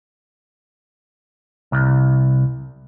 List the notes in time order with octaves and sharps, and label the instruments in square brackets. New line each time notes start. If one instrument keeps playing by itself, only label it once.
[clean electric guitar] C2